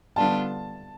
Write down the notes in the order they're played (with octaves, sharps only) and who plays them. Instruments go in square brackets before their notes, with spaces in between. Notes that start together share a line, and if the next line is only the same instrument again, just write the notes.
[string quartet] D3 G3 B3 D4 F4 [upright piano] A5